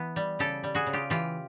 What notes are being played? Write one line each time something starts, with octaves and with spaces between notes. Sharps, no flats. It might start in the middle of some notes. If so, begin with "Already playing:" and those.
Already playing: E3 B3
G3
C#3 G4 A4
G3
F#4 G#4
C#3
F4 G4
E3 F4 G4